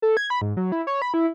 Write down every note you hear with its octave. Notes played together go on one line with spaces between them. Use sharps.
A4
G#6
B5
G#2
F#3
E4
C#5
B5
E4